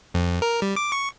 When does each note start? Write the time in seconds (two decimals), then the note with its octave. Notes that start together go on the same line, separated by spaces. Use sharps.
0.14 F2
0.42 A#4
0.62 G3
0.76 D6
0.92 C#6